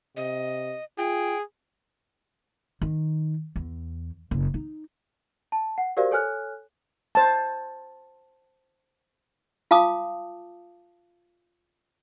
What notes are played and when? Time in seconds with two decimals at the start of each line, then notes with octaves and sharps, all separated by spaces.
0.17 C3 D#5
0.98 F4 G#4 G5
2.82 D#3
3.56 E2
4.31 F#1
4.54 D#4
5.52 A5
5.78 F#5
5.97 F#4 G4 A#4 C5 D5 F5
6.11 A4 C#5 G#5 F6 F#6
7.15 C5 A5
9.71 F4 F5 A5 D6 D#6